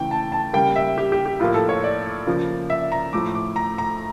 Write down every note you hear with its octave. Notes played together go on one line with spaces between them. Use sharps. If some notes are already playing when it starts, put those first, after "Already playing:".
Already playing: C#3 E3 A3 G5
A5
A5
C#3 G3 A#3 G5
E5
G4
G4
G4
A2 F3 A#3 F4
A4
C#5
D5
C#3 F3 A#3
E5
A#5
A2 F3 A3 D6
D6
A#5
A#5